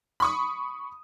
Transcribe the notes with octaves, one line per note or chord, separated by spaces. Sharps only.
B5 C#6 D#6